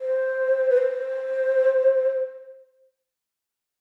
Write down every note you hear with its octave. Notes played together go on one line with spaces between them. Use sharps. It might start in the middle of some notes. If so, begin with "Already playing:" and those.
C5
B4
C5